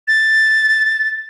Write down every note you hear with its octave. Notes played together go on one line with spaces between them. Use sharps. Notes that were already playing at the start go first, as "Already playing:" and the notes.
A6